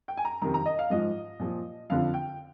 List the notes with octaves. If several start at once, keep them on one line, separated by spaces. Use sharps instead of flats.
G5
G#5
A#5
F2 C3 D#3 A#5
A#5
D#5
F5
G#2 F3 D#5
A#2 F3
F2 D3 F3 F5
G5